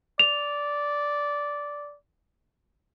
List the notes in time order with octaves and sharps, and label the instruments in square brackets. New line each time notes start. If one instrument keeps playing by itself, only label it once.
[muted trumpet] D5 [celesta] F7